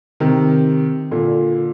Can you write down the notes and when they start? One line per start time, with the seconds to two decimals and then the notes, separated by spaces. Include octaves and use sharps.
0.20 C3 D#3
1.11 A#2 D3